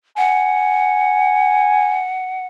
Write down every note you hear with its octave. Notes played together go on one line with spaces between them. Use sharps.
F#5 G#5